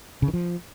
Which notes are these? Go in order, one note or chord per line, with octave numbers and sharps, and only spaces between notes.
C#3
D#3
F3